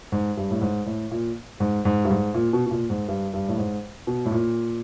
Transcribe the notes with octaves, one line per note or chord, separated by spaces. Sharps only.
G#2
G2
A2
G#2
A2
A#2
G#2
G#2
G2
G#2
A#2
B2
B2
A#2
G#2
G2
G2
A2
G#2
B2
A2
A#2